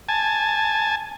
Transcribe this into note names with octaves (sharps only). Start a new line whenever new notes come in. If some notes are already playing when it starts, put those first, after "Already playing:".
G#5 A5